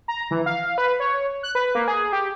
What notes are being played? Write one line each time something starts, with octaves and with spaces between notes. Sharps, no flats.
A#5
E3
F5
B4
C#5
F#6
B4
A#3
G#4
G4